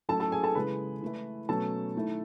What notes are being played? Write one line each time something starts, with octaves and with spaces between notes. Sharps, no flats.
A2 F#3 C#4 E4 A4 A5
A4 A5
G#4 G#5
A4 A5
C#3 E3 G#3 B4 B5
E3 A3 E4
B2 F#3 A3 C#4 A4 A5
D#3 A3 E4